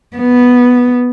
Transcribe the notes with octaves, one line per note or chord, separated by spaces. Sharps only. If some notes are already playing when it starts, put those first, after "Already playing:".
B3